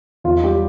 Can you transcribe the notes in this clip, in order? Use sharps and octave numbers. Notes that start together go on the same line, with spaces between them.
E2 F4
G3 G4